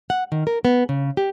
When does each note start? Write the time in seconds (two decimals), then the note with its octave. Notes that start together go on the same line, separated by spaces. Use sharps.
0.10 F#5
0.32 D#3
0.47 A#4
0.65 B3
0.89 C#3
1.17 G4